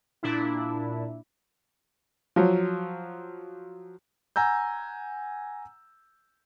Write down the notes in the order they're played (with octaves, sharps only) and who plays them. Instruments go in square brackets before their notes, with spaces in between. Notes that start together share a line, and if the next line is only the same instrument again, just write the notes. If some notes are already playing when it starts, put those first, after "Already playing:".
[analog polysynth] A#2 D4 E4
[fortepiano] F3 F#3
[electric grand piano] F#5 G#5 A#5 E6 G6